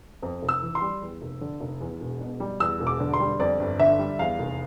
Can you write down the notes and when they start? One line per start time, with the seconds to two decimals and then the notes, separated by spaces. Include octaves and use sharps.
0.22 F2
0.43 F1
0.49 E6
0.62 E3
0.75 C6
0.82 G3
1.01 E2
1.22 F1
1.41 D3
1.61 F1
1.80 E2
2.01 E1
2.21 B2
2.40 G3
2.60 E2 E6
2.80 E1
2.87 D6
3.00 D3
3.14 C6
3.20 G3
3.40 F2 D5
3.59 G1
3.79 D3 E5
3.99 G3
4.19 E2 F5
4.39 F1